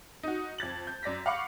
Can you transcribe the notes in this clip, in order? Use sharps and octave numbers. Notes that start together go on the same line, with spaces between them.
D#4 F#4
F2 G#6 A6 F#7
G6
F#2 D5 A#6 B6
F5 F#5 B5 C#6 D6 C#7